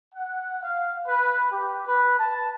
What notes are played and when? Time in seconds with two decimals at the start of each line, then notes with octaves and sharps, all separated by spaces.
0.13 F#5
0.62 F5
1.06 B4
1.50 G4
1.85 B4
2.18 A5